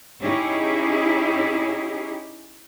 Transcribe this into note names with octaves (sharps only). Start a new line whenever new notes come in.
C#4 D#4 E4 G4 G#4 C#5